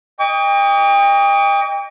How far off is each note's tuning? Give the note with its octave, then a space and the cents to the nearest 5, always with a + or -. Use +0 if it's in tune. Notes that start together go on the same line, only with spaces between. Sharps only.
D#5 +0 G5 +35 D6 -45